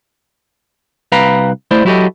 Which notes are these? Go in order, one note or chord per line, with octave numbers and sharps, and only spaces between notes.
C2 B4 F5 G5 A#5 B5
A3 E4 C5 D5
F#3 E4 F#4 G4 A4 D#5